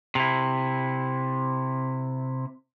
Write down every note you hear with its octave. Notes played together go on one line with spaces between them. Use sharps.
C3 E4